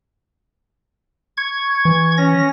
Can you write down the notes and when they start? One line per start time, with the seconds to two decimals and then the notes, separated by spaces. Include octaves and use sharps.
1.37 C#6 G#6
1.85 E3
2.17 C#4 A#6